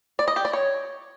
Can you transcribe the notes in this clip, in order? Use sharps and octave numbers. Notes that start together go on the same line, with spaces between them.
D5
D#5
G4
D5
C#5